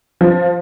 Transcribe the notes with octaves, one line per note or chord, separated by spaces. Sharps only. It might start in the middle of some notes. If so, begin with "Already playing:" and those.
F3